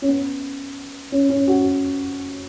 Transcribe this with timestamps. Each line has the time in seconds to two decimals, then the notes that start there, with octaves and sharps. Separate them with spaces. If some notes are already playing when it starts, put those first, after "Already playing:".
0.02 C#4
0.08 B3
1.12 C#4
1.29 C#4
1.47 F#4